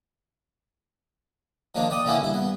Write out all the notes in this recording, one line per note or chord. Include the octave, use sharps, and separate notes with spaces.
D#3 F3 A#3 D4
D5 G5 D#6
D3 E3 A#3 B3 C#4 E4
G2 E4
G2 B3